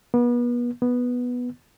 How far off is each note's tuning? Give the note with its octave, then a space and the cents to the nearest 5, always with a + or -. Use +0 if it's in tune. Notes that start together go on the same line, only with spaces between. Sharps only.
B3 -35
B3 -5